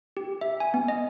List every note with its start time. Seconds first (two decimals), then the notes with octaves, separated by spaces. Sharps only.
0.17 G4
0.41 E5
0.60 G#5
0.74 B3
0.88 D#5